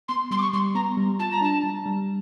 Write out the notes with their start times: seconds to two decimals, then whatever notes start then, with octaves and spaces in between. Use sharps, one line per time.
0.08 B3 C6
0.31 G3 C6
0.38 D6
0.42 C#6
0.53 G3 C6
0.75 B3 A#5
0.97 G3
1.19 F4 A5
1.31 A#5
1.41 D4 A5
1.64 G3
1.86 G3